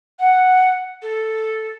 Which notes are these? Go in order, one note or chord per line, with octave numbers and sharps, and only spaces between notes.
F#5
A4